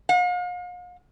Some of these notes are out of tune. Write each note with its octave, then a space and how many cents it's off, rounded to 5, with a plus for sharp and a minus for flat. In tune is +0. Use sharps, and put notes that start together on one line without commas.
F5 +45